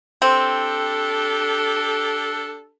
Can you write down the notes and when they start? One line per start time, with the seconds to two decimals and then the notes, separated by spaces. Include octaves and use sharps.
0.22 C4 D4 G4 A4